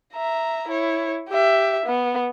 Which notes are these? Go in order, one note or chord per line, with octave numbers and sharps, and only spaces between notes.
E5 A#5
E4 C#5
G4 E5
B3